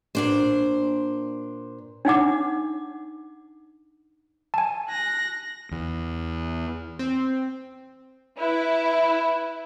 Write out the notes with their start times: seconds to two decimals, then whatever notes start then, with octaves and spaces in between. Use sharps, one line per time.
0.15 A#2 D4 C5
2.05 D4 D#4 F#5 D6
4.54 G#5 A5
4.90 F#6 A#6
5.71 E2
6.99 C4
8.40 E4 B4